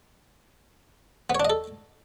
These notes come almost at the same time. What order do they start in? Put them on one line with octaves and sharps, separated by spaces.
B3 C#5 D4 D#5 A4